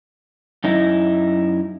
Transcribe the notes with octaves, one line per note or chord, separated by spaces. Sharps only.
F#2 D#4 E4